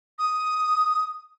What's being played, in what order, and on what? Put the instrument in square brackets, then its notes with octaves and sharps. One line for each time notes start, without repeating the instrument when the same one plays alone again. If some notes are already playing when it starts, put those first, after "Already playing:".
[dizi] D#6